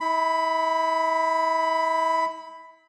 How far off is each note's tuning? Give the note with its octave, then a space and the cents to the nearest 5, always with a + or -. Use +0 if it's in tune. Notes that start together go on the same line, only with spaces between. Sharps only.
E4 -35 B5 +10